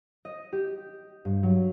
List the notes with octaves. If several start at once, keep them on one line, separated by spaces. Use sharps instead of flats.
D#5
G4
G2
F#3